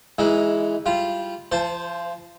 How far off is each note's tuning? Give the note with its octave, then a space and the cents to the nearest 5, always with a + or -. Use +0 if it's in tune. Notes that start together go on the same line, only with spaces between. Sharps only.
E3 +0 G#3 +0 D#4 +25
G3 -5 F4 -15
F3 -35 C5 +0 A5 +0